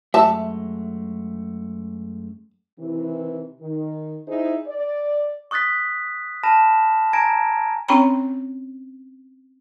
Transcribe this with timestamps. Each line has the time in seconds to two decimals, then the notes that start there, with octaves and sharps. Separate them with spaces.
0.14 F#2 G#3 A3 E5 A5
2.79 C3 D#3 E3
3.61 D#3
4.28 D#4 E4 G#4 C5 E5
4.67 D5
5.51 C#6 D#6 F#6 A6 B6
6.43 A5 B5 F6 A#6 E7
7.13 G#5 A#5 G#6 A#6 D7
7.88 C4 C#4 C#5 G5 A#5 B5